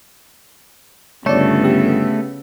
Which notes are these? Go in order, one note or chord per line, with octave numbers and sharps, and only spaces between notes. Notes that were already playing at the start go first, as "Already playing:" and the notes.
G1 C#3 A3 B3 A4 C#5 D5
G4 E6